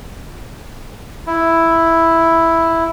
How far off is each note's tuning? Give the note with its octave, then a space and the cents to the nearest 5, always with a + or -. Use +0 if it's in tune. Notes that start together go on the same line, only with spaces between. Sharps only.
E4 +0